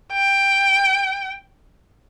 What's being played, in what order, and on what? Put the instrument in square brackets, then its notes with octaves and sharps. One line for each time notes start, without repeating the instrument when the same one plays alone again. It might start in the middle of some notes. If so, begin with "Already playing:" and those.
[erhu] G5